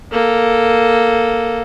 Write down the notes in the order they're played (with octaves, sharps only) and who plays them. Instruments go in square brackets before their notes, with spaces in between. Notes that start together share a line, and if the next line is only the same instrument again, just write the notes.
[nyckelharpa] A#3 A4